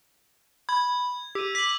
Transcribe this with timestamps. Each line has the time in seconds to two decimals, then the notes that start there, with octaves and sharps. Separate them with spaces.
0.69 B5 G#6
1.35 G4 E6 D#7
1.55 D6 B6 F#7